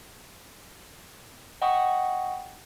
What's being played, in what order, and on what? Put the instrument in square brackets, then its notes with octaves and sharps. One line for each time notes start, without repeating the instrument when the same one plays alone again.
[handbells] D#5 F#5 G5 B5 C#6 D#6